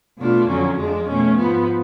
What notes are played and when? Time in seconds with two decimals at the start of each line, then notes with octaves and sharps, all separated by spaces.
0.18 B2 A3 D4 F4
0.47 F2 D3 F#3 C#4
0.78 F2 F3 G#3 D4
1.07 B2 A3 C#4
1.36 G#2 F3 B3